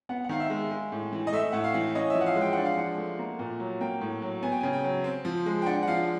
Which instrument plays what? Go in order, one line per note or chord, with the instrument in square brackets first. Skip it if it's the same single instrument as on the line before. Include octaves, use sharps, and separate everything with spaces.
[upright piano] B3 F#5
F#5
D#3 F5
E5
G#3
G#3
A2
E3
D#5
A3 E5
A2 F#5
F5
E3
C#4 D#5
E5
F3
F#5
F5
G#3
G5
D4 F#5
F5
F3 F#5
A3
A#3
A#2
F#3
A#3 G5
A2
F#3
B3 G#5
G5
C#3 G#5
G5
F#3
C4
F3
G#3
G5
D4 F#5
F#5
F3 F5